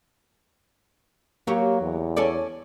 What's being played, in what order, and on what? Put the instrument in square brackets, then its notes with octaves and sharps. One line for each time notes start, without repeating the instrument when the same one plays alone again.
[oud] F#3 G4 C#5 [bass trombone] A#3
[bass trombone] E2
[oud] C#4 A4 D5